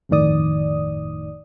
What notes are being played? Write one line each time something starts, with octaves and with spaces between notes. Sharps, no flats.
G1 F2 A2 D#3 D5 D#6